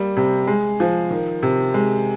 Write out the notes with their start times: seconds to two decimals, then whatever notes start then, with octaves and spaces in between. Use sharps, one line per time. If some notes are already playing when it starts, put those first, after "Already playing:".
Already playing: G3 A#3
0.17 C3
0.47 G#3
0.80 F3
1.11 D#3
1.43 C3
1.74 G#3